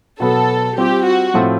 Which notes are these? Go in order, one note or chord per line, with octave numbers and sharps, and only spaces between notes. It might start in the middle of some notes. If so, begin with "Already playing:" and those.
B2 F#3 B3 A4
G3 C4 F4 G4
F#4
A2 F3 A3 C4 F4